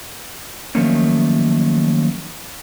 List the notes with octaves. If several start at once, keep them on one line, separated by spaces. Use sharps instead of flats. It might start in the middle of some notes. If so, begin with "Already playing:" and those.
D#3 F3 F#3 A3 A#3 C#4